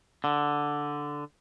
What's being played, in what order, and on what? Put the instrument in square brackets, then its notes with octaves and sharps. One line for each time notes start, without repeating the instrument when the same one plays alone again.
[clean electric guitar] D3